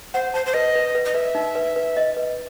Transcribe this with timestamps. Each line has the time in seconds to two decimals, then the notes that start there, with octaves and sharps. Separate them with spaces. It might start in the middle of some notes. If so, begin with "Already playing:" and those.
0.14 C5 F#5
0.34 C5 A5
0.46 C5
0.54 B4 D#5
0.75 B4
0.95 B4
1.05 D#5
1.14 B4 E5
1.35 D#4
1.55 B4
1.76 B4
1.97 D#5
2.16 B4